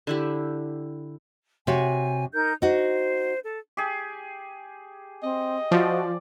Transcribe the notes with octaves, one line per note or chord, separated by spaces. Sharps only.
D3 E4 G4
C3 F#4 C#5 G#5
D#4 A#4 G6
D#4 F#4 C5
A4
G4 G#4
C4 D#5
F3 F#4 D5